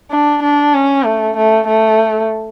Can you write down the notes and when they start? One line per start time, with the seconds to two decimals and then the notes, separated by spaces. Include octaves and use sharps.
0.11 D4
0.43 D4
0.74 C#4
1.05 A3
1.37 A3
1.67 A3